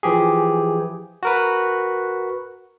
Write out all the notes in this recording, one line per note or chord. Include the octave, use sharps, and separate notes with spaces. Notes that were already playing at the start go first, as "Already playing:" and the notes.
E3 F3 G4 G#4
F#4 A#4 B4